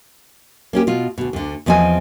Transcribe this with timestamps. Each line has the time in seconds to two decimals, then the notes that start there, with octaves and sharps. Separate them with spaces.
0.73 A#3 C#4 G4
0.87 B2 F4
1.18 D2 B2
1.33 D2 D3
1.66 E2 F3 C4 D#5 G#5